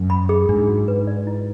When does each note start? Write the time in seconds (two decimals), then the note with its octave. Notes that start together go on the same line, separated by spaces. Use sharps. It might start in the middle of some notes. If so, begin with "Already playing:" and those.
Already playing: F#2
0.10 B5
0.29 G#4
0.49 G#2 D4
0.69 F#4
0.88 B4
1.07 D5
1.27 E4